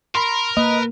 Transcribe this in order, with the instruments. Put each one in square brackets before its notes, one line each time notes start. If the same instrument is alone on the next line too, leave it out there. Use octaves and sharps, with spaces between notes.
[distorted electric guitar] A#4 [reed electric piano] B5 C6
[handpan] A#3 [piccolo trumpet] B4 [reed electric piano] D#5